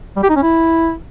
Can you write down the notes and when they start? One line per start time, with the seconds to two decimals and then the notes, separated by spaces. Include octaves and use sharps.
0.17 G3
0.23 G4
0.30 D#4
0.36 C#4
0.43 E4